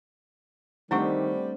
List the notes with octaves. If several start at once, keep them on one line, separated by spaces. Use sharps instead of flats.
D#3 G3 A3 C4 D4 E4 F#5 C#6